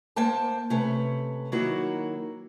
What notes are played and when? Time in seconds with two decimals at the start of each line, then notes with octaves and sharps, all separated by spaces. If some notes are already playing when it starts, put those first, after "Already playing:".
0.16 A#3 C5 G5 A5
0.70 C3 A3 C#4 B4
1.52 D#3 F#3 A#3 D#4 E4 F#4